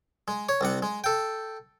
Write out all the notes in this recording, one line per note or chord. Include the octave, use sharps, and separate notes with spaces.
G#3
C#5
C2 C3 F#5
G#3
A4 G5